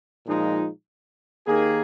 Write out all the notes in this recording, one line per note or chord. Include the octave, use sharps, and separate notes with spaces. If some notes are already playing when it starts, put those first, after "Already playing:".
A#2 F3 G#3 D#4
D#2 D#3 A#3 G#4